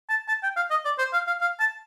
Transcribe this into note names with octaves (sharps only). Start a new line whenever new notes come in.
A5
A5
G5
F5
D#5
D5
C5
F5
F5
F5
A5